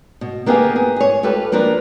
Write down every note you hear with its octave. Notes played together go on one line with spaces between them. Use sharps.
B2
A#3 B3 G4 G#4 A#4 F5
G#4
G#4 C#5
F4 G4 A4 B4
F3 A#3 D4 A#4 B4